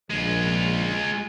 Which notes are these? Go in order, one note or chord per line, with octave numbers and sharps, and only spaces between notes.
A#1 G#3 F4